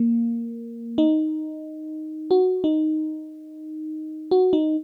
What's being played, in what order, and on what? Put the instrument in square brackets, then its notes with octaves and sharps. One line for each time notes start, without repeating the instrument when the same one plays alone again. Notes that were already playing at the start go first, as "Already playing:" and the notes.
Already playing: [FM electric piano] A#3
D#4
F#4
D#4
F#4
D#4